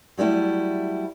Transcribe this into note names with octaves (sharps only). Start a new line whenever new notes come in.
F#3 G3 A3 E4